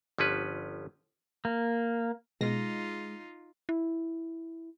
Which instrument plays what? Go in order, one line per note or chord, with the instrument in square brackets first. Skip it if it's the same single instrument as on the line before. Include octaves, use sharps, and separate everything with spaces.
[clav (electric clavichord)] G1 F3 C#4 B4
[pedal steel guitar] A#3
[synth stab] B2 A#6 [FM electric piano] G#3 [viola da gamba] D#4 F4
[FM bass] E4